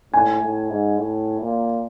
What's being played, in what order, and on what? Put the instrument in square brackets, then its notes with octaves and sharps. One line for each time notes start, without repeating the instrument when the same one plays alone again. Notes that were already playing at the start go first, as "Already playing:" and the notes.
[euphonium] A2 [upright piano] G#5
[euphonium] A2
G#2
A2
A#2